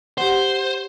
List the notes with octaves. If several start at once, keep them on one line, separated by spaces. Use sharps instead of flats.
G4 C5 F#5